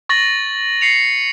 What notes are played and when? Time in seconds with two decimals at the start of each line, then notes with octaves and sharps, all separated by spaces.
0.09 C#6 A6 A#6 F#7
0.81 C7 C#7 F7